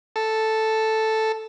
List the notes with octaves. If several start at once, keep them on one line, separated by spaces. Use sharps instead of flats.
A4